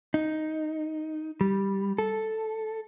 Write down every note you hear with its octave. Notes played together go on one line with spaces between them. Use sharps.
D#4
G3
A4